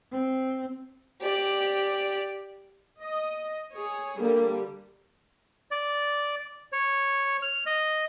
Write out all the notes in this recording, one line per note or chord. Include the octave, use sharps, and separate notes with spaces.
C4
G4 D5
D#5
G#4 C#5
D3 G3 A#3
D5
C#5
F6
D#5